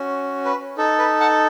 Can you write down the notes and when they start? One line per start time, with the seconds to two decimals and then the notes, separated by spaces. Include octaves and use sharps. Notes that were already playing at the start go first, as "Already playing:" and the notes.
Already playing: C#4 F#4
0.45 B4
0.78 D#4 A4
0.99 B4
1.20 F#5 A5